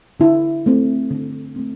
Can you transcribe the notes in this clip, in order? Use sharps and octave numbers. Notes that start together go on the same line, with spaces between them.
D3 E4
A3 C4
D3
A3 C4